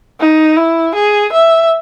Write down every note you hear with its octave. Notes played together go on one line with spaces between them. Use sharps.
D#4
E4
G#4
E5